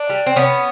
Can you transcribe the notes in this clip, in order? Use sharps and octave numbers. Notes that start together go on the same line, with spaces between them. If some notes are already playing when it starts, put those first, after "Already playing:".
Already playing: D4
G3
C4
C3 B3 C#4